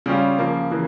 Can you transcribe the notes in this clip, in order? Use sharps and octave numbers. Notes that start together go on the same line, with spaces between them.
C#3 G3 C#4 F4
C#3 F3 A#3
C#3 E3 A#3